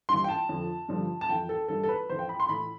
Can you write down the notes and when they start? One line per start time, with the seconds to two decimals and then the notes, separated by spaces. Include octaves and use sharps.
0.09 G2 E3 C6
0.24 G5
0.29 A5
0.49 F2 D3 F3
0.88 G2 D3 F3
1.21 A5
1.29 F2 E3 G5
1.49 A4
1.68 G2 E3 A4
1.83 A4
1.89 B4
2.09 F2 E3 C5
2.19 G5
2.29 B5
2.40 C6
2.49 A2 E3 B5